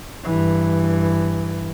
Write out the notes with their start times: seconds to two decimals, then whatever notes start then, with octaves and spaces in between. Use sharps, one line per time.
0.24 G2 E3